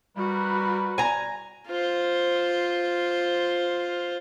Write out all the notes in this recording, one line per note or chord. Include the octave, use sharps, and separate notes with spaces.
G3 F#4 A#4 B4
G#5 A#5
F4 C5